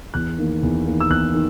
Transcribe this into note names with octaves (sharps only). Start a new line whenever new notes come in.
E2 F#6
D#3 A#3
E2
D#3 A#3
E6
E2 F#6
D#3